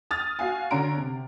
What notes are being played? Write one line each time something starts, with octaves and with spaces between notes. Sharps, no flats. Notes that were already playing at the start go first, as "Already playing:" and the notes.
D#6 F6 A6
F#4 F5 G#5
D3 C#4 A#5 C6 D7
C3